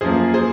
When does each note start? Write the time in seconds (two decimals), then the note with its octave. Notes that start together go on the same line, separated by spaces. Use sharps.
0.01 F#2 F3 A#3 G#4 C5
0.34 G#4 C5